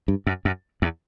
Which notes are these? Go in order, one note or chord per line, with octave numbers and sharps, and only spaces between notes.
G2
F#2
F#2
E2